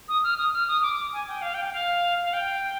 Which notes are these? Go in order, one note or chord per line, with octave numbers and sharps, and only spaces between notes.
D#6
F6
D#6
F6
D#6
D6
D6
G#5
G5
F5
G5
G5
F5
F5
G5